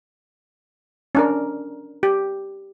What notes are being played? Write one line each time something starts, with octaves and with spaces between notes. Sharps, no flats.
C#4 D4 A#4
G4